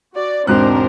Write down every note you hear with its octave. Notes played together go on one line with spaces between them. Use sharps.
F#4 D5
E1 G#2 C4 D4 A#4 C5 F#6